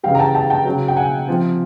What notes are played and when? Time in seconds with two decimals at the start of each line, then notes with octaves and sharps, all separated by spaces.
0.03 C#3 E3 G3 F5 G5
0.15 A#5
0.19 G5 A5
0.35 G5 A5
0.50 G5 A5
0.65 C#3 F#3
0.88 G5
0.96 F#5 G#5
1.28 C3 F3